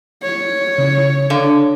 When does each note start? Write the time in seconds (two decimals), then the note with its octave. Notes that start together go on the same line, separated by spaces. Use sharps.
0.23 C#5
0.78 C#3
1.30 D3 F5